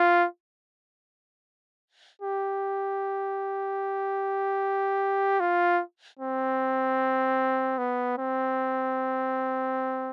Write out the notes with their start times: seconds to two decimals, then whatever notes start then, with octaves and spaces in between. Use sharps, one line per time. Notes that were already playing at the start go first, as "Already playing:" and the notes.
Already playing: F4
2.22 G4
5.40 F4
6.19 C4
7.78 B3
8.18 C4